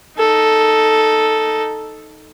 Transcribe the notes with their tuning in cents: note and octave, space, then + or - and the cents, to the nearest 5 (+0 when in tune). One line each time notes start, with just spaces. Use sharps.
D#4 +0 A4 +0